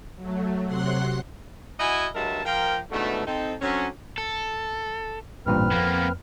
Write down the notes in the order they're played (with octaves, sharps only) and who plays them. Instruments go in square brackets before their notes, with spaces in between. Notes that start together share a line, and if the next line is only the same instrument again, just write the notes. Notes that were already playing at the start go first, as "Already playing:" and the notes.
[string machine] F#3 A3
C3 F#3 F#5 C6 F#6
[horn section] E4 F#4 D#5 F#5 G#5
G2 F#3 G#3 A#4 E5 A5
F3 A#4 G5
G#2 B2 D3 E3 A3
C4 D#4 A4
D3 F#3 C4 C#4
[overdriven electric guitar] A4
[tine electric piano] A1 G2 A#2 [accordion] C4 B4 F6
[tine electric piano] F2 [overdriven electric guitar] A#3 B3